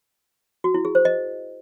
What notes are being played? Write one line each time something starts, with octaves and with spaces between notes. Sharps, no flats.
F#4
E4
G#4
C5
D#5